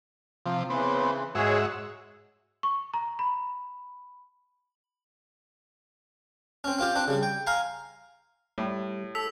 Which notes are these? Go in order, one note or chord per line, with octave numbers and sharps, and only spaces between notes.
C3 F3
C#3 E3 B3 C4
G#2 G#3 F#4 G#4 C#5 E5
C#6
A#5
B5
C4 C#4
C4 F4 G4
C4 D4
C#3 G3
G5
F5 G#5 A#5 C6
A2 G3
A4 E6 B6 F7